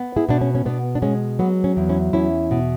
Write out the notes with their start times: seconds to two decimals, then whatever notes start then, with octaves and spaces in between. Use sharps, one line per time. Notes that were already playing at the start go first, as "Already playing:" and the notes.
Already playing: B3
0.16 E4 G#4
0.29 B2 D4
0.41 C#4
0.55 C#4
0.65 B2 B3 D4
0.95 D4
1.02 G#3 C#4
1.39 F#3 B3
1.64 C#4
1.77 E2
1.89 C#4 E4
2.13 E2 C#4 E4
2.51 B2